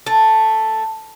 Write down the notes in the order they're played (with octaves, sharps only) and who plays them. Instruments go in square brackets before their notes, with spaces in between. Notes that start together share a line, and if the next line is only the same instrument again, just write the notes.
[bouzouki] A3